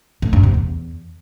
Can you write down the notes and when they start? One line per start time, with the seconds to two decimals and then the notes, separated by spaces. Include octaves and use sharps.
0.22 A2
0.33 G2
0.43 C3
0.54 E2